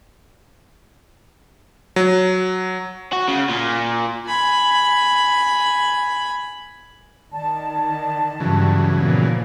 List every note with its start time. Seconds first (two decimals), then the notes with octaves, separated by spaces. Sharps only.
1.96 F#3
3.12 F#4
3.28 C#3
3.49 A#2
4.27 G#5 B5
7.32 D#3 D5 A5
8.40 G2 C#3 E3 F#3
9.00 A#2 F3 B3